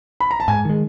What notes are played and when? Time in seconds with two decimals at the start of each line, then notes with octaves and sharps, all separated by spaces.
0.20 B5
0.31 A#5
0.40 A5
0.48 G#2 G#5
0.65 D#3 G#3